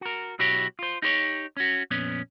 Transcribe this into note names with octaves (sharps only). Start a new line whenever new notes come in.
F#4 A#4
B1 B2 E4 F#4 G4 C#5
F4 C5
D#4 G4 C5 C#5
C#4 F#4
F2 A#2 B3 C#4